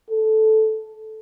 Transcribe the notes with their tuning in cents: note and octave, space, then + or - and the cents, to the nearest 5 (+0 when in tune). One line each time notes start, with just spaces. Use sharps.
A4 -10